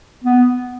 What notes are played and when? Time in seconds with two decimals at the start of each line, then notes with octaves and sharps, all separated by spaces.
0.24 B3